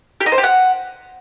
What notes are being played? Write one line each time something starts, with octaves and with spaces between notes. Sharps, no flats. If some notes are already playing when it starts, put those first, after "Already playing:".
G4
D#4
C5
G4
F#5